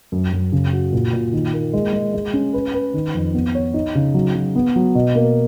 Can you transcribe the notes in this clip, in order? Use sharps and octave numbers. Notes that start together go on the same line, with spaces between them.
F#2
F#2
C#3
F#4
A#2
A#2
D#3
A#3
G#3
G#3
G#3
C#4
B4
B4
D#3
F2
B3
C#5
D#4
C#3
F#3
F#3
B3
F#3
B2
A#3